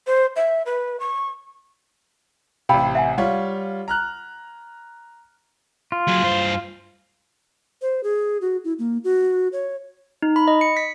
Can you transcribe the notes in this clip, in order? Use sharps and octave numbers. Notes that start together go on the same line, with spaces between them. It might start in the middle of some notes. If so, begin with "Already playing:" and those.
C5
E5
B4
C#6
A1 C3 F5 G5 B5
E5 F#5 G#5
G3 F4 C#5 F#5
A#5 F6 F#6
F4
F#3 G#4
G2 C5
C5
G#4
F#4
E4
A#3
F#4
C#5
D#4
B5
D#5
C#7
B6